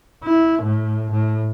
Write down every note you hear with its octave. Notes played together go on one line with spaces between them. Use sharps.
E4
A2
A2